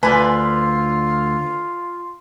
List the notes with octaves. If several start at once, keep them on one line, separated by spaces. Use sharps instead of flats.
D2 D3 F4 B4 D5 G#5